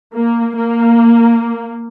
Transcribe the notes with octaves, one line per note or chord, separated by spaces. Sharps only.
A#3
A#3